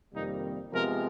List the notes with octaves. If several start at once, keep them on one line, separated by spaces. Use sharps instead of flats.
F2 C3 D#3 G3 A#3 D#4
C3 F3 G#3 B3 A#4